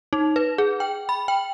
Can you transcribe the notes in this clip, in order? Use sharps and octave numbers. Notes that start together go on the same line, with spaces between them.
D#4
B4
G#4
G5
B5
G5